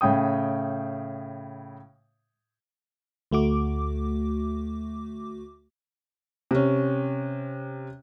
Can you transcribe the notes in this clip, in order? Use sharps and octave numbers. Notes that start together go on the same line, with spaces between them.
A2 C#3 G5 D#6
D2 A3 F#4 D6
C3 C#4